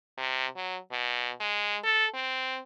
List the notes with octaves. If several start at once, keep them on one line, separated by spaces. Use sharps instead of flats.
C3
F#3
B2
G#3
A4
C4